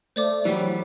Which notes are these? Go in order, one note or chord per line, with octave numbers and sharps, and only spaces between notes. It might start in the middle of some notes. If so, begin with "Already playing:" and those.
A3 C5 D5 D6
E3 F#3 G3